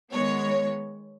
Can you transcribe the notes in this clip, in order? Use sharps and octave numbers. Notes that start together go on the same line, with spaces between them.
D#3 G#3 B3 C#5